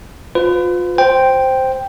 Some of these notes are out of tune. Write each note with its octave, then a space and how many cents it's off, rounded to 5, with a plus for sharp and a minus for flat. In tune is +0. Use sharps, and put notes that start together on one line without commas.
F4 +30 B4 +40
C5 +0 G5 +0